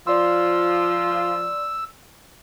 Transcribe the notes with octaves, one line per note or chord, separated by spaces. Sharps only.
F3 F4 D5 C6 E6